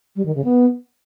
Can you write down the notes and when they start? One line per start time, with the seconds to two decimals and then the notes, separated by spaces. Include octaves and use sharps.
0.16 G3
0.25 D#3
0.35 C#3
0.44 B3